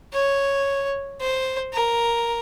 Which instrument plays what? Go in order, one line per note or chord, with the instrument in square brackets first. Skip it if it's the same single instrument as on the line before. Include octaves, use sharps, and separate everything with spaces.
[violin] C#5
C5
A#4